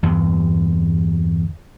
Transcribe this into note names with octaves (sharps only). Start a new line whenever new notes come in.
E2 G2 D3